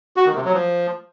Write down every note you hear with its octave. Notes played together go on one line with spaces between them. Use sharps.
F#4
D#3
C3
F#3
F3